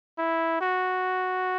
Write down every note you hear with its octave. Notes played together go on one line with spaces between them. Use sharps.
E4
F#4